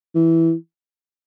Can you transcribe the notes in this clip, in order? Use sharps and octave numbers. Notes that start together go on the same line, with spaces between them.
E3